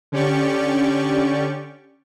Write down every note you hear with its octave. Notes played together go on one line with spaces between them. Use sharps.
D3 C#4 G4 D5 C#6